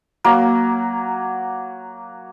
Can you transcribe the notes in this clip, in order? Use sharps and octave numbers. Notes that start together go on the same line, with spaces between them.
F#3 A#3